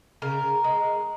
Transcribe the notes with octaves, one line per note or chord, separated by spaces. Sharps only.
C#3 A#4
G#3